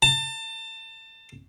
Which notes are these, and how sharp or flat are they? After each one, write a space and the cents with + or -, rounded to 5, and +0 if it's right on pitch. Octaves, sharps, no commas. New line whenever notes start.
A5 +30